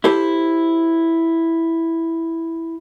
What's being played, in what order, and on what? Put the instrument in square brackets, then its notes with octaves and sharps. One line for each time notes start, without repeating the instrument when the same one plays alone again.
[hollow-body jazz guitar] E4 G4 A4 C5